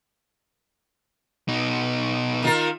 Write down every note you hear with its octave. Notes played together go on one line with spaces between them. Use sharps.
B2 D#4
D#3 F4 A#4